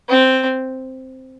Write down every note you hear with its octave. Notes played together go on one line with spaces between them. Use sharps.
C4